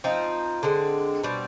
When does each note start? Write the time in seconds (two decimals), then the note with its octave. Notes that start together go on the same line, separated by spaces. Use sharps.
0.04 F3 C4 D#4
0.63 D3 G#3 C4
1.23 B2 G3 C4